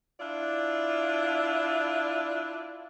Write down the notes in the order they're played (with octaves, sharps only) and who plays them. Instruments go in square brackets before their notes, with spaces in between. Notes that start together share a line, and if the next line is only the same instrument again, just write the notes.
[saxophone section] D4 E4 F4 D5